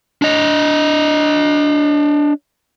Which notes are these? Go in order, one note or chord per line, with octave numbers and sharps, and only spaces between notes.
D4 D#5